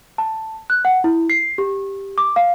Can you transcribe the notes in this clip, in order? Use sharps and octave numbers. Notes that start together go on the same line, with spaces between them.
A5
F#6
F#5
E4
C7
G4
D6
F5